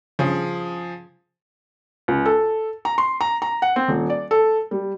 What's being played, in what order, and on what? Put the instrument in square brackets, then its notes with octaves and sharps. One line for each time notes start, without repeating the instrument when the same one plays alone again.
[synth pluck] G2 C#3 [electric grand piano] F3 G#4
[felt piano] C#2
A4
A#5
C6
A#5
A#5
F#5
C4
D#1
D5
A4
G3